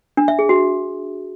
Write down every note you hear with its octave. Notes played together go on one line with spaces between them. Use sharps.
D4
E5
G#4
F#4